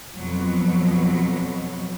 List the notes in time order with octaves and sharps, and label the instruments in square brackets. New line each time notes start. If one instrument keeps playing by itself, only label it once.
[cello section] F2 B2 F#3